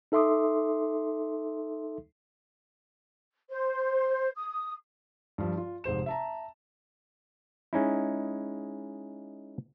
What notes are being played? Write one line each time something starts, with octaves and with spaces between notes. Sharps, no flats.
D#4 A4 E5 C6 D6 D#6
C5
D#6
G2 F3
F4
F1 G#2 C5 E7
E5 A5 A#5
G#3 C#4 D#4 E4